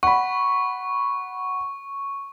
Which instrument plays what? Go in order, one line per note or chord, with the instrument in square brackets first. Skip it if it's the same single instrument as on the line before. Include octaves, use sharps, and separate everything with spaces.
[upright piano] F#5 B5 [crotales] C#6